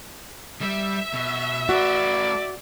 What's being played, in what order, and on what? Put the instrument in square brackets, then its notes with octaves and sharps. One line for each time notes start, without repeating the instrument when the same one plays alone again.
[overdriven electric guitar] G3 [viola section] E5
[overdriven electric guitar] B2
[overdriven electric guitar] A3 B4 [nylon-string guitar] F#4 [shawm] D5